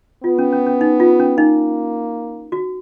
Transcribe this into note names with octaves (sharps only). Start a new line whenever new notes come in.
B3 F4
C#4
C#4
C#4
D#4
F4
C#4
A#3 D#4
F#4